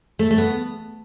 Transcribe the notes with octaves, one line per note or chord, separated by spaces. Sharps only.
A3
A3
B3